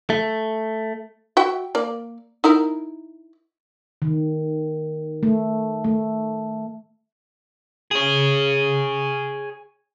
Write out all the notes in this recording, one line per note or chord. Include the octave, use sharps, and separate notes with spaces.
A3
F#4 E5 G5
A#3 D5
D#4 E4 A#4
D#3
A3
A3
G#4 C#5